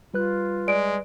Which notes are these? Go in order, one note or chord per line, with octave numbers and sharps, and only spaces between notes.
G3 F4 B4 F#6
G#3 D5 D7